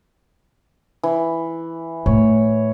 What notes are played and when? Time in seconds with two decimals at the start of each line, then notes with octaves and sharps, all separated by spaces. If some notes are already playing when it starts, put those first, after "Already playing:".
1.03 E3
2.06 A2 C#5